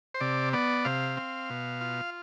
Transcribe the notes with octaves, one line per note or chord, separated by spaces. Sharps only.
C5
C3 D5
B3 D5
C3 F5
C4
B2
F4